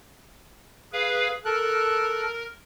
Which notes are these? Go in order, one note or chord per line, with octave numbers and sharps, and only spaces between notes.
G#4 B4 F5
A4 A#4 F#6